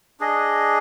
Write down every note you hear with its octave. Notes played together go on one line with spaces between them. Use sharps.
D4 G#4 D#5